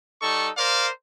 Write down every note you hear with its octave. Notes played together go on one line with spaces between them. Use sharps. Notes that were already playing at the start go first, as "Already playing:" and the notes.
G3 D#4 A4 C#6
A#4 C5 D5 F5